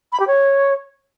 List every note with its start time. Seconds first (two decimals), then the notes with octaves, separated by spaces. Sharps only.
0.12 B5
0.20 G4
0.27 C#5